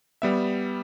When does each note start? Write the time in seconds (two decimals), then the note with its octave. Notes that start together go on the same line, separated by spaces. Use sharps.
0.22 G3 B3 E5